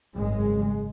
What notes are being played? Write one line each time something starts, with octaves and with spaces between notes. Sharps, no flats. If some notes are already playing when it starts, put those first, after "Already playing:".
G#1 F#2 C#3 G#3